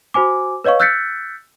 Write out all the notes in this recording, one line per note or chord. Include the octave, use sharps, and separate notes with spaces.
F#4 C5 G#5 D6
B4 C#5 D#5 F5 C#6
E6 F#6 G6 A6 B6 C#7